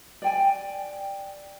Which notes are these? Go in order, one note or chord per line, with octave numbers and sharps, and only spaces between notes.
D5 G5 G#5